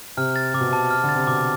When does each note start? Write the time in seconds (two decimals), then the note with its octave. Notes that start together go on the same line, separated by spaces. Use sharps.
0.17 C3 F6
0.36 A6
0.54 C3 D6
0.61 B2
0.69 C3 A5
0.91 F6
1.04 D3
1.09 A6
1.15 C3
1.27 B2 D6